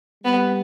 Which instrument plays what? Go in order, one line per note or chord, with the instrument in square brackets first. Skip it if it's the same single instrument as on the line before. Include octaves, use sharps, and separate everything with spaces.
[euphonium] G3 [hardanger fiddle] B3